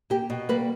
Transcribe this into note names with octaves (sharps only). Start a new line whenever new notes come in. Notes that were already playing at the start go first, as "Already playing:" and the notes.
A#3 G4
B2
G3 A#3 B4